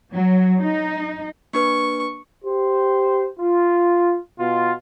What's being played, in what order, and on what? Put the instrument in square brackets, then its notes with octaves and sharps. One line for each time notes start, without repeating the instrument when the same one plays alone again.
[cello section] F#3
D#4
[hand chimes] A#3 D4 B4 [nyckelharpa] C#6
[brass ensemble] G4 C5
F4
B2 F4